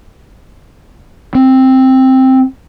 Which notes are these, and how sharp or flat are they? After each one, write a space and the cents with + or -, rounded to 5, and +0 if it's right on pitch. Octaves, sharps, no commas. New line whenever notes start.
C4 +5